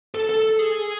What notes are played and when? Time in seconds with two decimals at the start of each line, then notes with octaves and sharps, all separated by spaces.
0.15 A4
0.29 A4
0.59 G#4